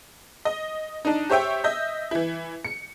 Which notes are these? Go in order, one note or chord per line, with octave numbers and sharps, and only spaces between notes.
D#5
D4 D#4
G4 C5 C#5 E5 G5
D#5 E5 G6
E3 E4
C#7